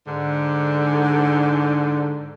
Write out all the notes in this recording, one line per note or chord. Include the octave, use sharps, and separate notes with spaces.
G#2 D3